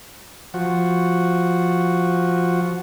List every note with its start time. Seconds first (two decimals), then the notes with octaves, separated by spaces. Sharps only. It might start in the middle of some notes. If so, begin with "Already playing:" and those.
0.54 F3 F#4